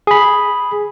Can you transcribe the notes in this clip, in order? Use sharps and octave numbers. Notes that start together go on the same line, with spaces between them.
G#4 B5